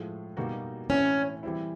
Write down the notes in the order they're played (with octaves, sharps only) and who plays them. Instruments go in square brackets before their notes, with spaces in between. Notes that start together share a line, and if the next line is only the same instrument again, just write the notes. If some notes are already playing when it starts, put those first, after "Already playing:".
Already playing: [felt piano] A2 F3 G#3
B2 G3 A#3 D#4 F#4
[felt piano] A2 E3 A3 C4 E4 [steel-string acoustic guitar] C#4
[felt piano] E3 G3 C4 E4